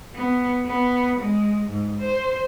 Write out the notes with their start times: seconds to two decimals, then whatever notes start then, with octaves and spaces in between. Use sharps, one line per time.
0.14 B3
0.66 B3
1.19 G#3
1.69 G#2
2.00 C5